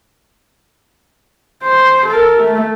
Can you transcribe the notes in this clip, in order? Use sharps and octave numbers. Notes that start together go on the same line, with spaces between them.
C5
A4 A#4
A3